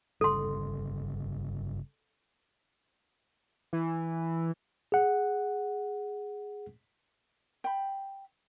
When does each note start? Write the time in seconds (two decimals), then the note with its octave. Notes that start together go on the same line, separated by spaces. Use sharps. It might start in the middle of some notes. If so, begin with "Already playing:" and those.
0.21 G1 C#3 G3 A4 C6
3.73 E3
4.92 G#4 F#5
7.64 G5 B5